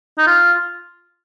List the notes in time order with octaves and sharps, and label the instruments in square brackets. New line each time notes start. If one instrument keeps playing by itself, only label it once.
[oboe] D#4
F4